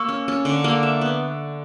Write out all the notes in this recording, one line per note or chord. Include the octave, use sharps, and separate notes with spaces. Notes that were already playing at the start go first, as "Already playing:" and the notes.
Already playing: A#3 C#6 E6
C#4
C#4
D3
A#3
E5
B3